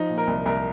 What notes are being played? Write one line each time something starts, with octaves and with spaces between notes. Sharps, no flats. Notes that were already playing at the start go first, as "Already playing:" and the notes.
Already playing: F3 D#4
A#2
A#4
C2
C2 A#4